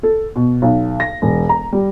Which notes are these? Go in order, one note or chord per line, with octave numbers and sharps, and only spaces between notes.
A4
B2
B1
A#6
E1
A#5
G3